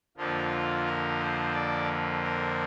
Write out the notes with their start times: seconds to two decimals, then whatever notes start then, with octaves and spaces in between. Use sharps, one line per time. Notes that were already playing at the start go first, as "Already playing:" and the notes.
0.17 F2 D3 F3 A#3 F4
0.85 A#4
1.20 C5
1.53 D5
2.22 A#4